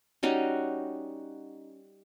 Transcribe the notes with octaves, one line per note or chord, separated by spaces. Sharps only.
G3 C#4 D#4 F#4